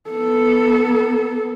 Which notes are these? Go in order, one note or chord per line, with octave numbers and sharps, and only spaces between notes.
B3 A4